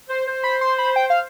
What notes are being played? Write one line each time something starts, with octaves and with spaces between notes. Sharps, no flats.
C5
C5
B5
C6
B5
G5
F5